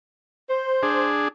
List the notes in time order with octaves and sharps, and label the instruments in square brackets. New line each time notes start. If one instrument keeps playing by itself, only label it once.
[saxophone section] C5
[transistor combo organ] D4 G#4